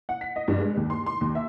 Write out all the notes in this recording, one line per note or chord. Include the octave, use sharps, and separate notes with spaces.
F#5
B6
D#5
G2
G#3
D#2
C6
C6
D#2
E5